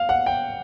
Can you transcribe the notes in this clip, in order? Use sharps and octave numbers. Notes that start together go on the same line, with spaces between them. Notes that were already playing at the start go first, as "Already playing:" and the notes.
Already playing: F5
F#5
G5